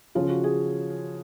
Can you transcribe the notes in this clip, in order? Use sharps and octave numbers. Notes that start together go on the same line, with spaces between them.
C#3 F3 F4
F#4
G#4